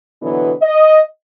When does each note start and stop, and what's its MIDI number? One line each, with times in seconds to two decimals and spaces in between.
0.22 0.53 47
0.22 0.53 50
0.22 0.53 52
0.22 0.53 54
0.22 0.53 59
0.62 1.02 75